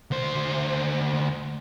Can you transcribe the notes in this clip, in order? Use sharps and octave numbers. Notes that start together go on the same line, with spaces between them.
D2 C5